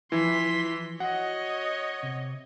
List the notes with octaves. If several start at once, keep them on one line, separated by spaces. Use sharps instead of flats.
E3 F3 E4 C6 B6
F#4 C#5 D#5 F#5
C3